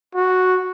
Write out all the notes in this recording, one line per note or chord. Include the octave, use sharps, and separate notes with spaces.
F#4